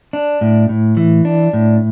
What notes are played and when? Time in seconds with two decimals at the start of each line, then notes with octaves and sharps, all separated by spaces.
0.13 D4
0.41 A2
0.69 A2
0.97 E3
1.25 D4
1.53 A2